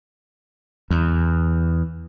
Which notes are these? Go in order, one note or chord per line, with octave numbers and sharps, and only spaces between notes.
E2